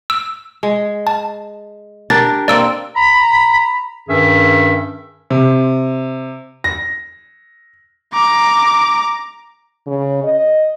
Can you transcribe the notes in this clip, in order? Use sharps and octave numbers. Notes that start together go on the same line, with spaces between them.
E6
G#3
A5
D4 G4 A#4 A6
A#3 C4 D5 E6 D7
A#5 B5
G2 D#3 C#4 G#4 E5
C3
A#6
A#5 D6
C#3
D#5